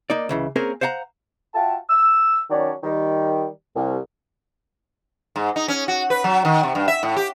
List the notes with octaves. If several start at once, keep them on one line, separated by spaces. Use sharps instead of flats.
A#3 D#4 D5
C#2 C#3 E3
A#3 C4 C#4 G#4 A#4
C5 F5 F#5 G#5 A#5
F4 F#4 E5 F5 G5 A5
E6
D#3 F#3 C#4 D4 C#5 D5
D#3 G3
C2
G#2
D#4
C#4
F#4
B4
F#3
D#3
C3
G2
E5
A2
G4